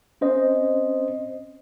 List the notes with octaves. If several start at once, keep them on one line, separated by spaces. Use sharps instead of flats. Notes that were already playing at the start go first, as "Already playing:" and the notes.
C4 C#4 C5 D#5